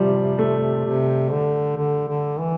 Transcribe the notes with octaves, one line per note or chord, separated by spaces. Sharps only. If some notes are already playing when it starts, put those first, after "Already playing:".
Already playing: C3 F3 G3
A3
C3
D3
D3
D3
E3